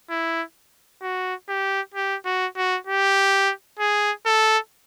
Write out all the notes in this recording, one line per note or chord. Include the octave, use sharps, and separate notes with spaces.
E4
F#4
G4
G4
F#4
F#4
G4
G#4
A4